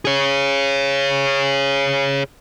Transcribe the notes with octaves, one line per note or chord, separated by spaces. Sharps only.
G#4 C#5